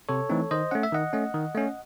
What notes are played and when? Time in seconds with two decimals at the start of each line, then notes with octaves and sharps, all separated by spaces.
0.09 C3 A4 C#5
0.29 E3 A3 C4 D#4
0.51 D#3 C5 D#5
0.71 A3 C#4 F#5
0.83 E5
0.92 D#3 D#5 F#5
1.13 A3 C#4
1.34 D#3
1.54 A3 C#4